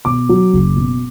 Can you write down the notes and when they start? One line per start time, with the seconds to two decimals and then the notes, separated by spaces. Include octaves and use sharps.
0.05 B2 D6
0.29 F#3
0.53 F#1
0.76 B2